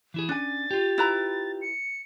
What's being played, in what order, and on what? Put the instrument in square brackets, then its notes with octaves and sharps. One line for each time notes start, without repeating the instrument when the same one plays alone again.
[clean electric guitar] E3 E4 G#4
[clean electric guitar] C#4 G#5 [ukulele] D4 [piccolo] A6
[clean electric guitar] F4 G4
[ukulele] E4 B4 A#5
[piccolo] C#7